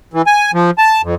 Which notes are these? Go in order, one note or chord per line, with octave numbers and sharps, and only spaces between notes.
E3
G#5
F3
A5
F2